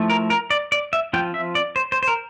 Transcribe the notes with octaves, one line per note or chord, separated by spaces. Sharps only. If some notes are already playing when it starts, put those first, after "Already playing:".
Already playing: F3 A3 E4
A#4
A#4
D5
D5
E5
F3 C4 F4 G5
E5
D5
C5
C5
C5
A#4